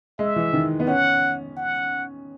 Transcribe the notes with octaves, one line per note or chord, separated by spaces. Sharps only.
G#3 E5
E3
D#3
B3
C#4 F#5
F#5